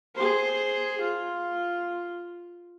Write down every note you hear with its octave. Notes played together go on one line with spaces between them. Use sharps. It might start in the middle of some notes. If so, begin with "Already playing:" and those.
G#4 C5
F4